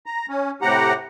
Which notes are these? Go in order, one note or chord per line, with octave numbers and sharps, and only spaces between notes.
A#5
C#4
A2 C3 G4 F#5 A#5